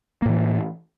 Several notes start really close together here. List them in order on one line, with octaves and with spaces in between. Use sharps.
A#3 A2 E3